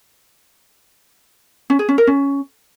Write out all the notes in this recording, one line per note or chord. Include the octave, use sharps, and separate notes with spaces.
C#4
G#4
C#4
A#4
C#4